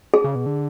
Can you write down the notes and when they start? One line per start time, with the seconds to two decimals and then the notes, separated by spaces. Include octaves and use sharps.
0.14 G#4
0.24 C#3
0.35 B2
0.46 D3